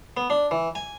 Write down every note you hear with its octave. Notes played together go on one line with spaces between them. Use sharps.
B3
D4
E3
G#5